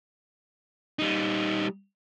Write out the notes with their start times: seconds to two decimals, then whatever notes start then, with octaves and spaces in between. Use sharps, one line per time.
0.99 G3 D#4